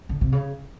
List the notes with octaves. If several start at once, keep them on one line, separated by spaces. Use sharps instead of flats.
D3
C3
C#3